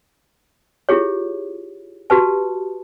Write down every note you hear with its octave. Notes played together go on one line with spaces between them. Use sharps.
E4 F4 G4 G#4 C#5
F#4 G4 B4 A5